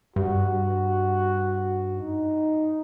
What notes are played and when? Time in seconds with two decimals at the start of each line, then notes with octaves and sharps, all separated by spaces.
0.16 G2 F#4
1.96 D#4